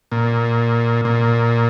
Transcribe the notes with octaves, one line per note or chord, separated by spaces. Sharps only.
A#2
A#2